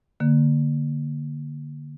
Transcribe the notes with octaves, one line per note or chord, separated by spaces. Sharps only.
D3 A#3